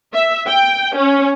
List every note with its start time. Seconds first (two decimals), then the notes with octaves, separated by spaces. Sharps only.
0.13 E5
0.47 G5
0.96 C#4